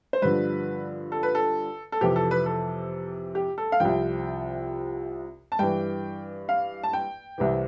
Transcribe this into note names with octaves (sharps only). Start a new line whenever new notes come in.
C5
G2 D3 F3 B4
A4
B4
A4
A4
F2 C3 E3 G4
A4
B4
A4
G4
A4
F5
C2 C3 F3 G5
A5
G2 E3 G5
F5
A5
G5
C2 C3 E3